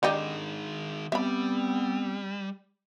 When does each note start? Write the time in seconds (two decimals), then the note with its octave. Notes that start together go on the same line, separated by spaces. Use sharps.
0.03 D3 D#3 G#3 D#4 G4
1.12 G3 B3 C4 E5 B5